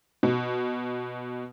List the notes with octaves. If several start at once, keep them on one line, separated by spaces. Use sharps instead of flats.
B2